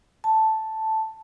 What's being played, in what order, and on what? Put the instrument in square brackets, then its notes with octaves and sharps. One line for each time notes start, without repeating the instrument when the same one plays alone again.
[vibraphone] A5